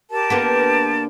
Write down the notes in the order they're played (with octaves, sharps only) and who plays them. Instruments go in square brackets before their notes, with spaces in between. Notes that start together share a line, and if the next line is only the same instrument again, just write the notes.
[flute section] G4 A#4 A5
[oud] D3 A#3 B3